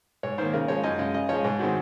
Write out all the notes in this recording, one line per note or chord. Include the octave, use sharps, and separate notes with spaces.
G#2 C#5
D#3 A#3 C5
C#3 A#4
F3 G#3 C#5
F#2 D#5
C#3 G#3
C#3 D#5
F3 G#3 C#5
G#2
D#3 G#3 C4 F#4